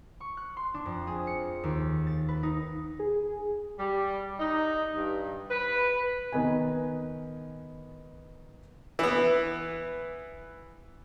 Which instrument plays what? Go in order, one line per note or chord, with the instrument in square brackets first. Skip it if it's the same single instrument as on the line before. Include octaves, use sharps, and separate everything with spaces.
[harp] C#6
F#6
C6
D4
F2
G#4
C#7
D#2
A6
B4
D#4
[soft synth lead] G#4
[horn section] G3
D#4
G2
B4
[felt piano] D#3 B3 D#5 G#5
[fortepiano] E3 B3